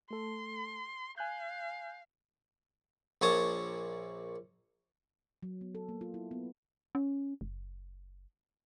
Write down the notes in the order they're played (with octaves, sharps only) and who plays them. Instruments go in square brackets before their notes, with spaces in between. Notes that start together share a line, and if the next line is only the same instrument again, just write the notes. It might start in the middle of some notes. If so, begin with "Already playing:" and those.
[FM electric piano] A3 A4 [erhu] C6
[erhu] F5 [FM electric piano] G#5 F#6 G6
[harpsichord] A#1 A#2 C#5 A5 D#6
[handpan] F#3
B3
A4
A#3
F4
E4
B3
[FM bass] C#4
F#1